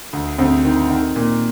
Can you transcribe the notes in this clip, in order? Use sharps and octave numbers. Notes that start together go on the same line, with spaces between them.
D2
D2 C4
D#3
D#3
A#2